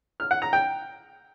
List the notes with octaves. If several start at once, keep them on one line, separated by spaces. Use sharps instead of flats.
F6
F#5
A#5
G5